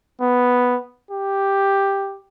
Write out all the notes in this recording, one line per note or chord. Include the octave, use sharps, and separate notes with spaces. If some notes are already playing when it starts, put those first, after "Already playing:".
B3
G4